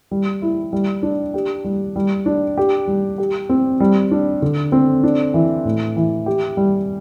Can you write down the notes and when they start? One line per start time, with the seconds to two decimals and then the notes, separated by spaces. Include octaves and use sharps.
0.11 G3
0.42 E4
0.73 G3
1.03 D4
1.34 G4
1.64 G3
1.96 G3
2.26 D4
2.58 G4
2.87 G3
3.18 G4
3.49 C4
3.80 G3
4.11 D4
4.42 D3
4.72 C4
5.03 D4
5.34 E3
5.65 A2
5.97 E3
6.26 G4
6.57 G3